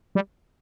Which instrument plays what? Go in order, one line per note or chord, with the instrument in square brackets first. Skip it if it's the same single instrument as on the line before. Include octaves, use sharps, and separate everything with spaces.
[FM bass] G3